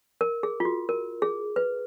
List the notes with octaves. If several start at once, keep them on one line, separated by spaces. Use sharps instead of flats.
A#4
G#4
F4
F#4
A#4
G#4
B4